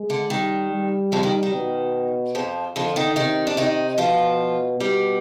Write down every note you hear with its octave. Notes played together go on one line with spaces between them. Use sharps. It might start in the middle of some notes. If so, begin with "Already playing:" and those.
Already playing: G#3
D3
D#3 G3
G3
F2 F3
D#3
D#3
B2
F2 F3
F2 D3 F3
D#3 D#4
C3 D#3 D#4
D4
D#3 D#4
B2 F3 F4
B2 G3 G4